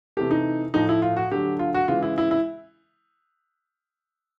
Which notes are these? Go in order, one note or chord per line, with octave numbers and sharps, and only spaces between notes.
C3 E3 A3 G4
D#4
A2 F3 A3 D#4
E4
F4
F#4
D3 F#3 A3 G4
F4
F#4
C#3 E3 G#3 F4
E4
E4
E4